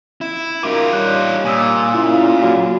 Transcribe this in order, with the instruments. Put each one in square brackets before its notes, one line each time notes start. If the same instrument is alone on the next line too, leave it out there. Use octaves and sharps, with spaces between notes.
[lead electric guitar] E4
[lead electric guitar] D#4 F4 [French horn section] F#4 A#4 [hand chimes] D6
[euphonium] G3 [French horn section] D4 G4 C#5 [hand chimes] F#6
[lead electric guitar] A#2 [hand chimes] G#5 D#6 E6
[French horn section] C#3 F4 [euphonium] E4
[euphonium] F#3 [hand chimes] F#4